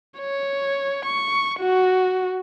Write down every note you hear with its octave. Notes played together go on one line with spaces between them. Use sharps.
C#5
C#6
F#4